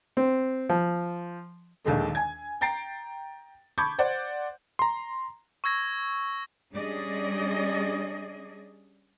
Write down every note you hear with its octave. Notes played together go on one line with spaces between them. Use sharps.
C4
F3
A#1 D#2 D#3 G#3 A3
G#5 G#6
G5 A#5 A6 C7 D7
A5 B5 C#6 D6 G6 G#6
C5 D5 F#5
A#5 C6
C#6 E6 G#6 A#6
G3 C#4 D4 G#4 D5 D#5